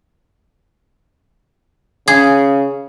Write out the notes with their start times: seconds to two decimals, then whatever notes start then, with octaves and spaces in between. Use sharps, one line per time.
2.08 C#3 G#4